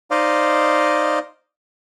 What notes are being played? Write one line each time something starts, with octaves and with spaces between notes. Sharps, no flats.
D#4 C5 D5 D#5 F5